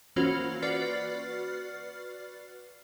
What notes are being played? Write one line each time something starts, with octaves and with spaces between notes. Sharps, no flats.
E3 A#3 C#4 F4 F#4 C5
F#4 B4 D5 F6 A6 C7